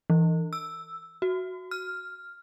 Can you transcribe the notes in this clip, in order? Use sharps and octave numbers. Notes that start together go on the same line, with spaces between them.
E3
E6
F#4
F6